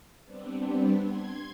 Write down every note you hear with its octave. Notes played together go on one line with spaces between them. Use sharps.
G3 B3 C4 D4
C6 G#6